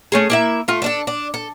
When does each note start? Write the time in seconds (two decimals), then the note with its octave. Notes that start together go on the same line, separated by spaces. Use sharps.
0.12 A3 C#4 G#4
0.30 A#3 E4 E5
0.68 A3 F4
0.82 A3 D4 A4
1.07 D4
1.34 A4